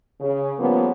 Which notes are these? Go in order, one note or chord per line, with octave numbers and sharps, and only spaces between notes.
C#3
C#3 F3 G3 A#3 B3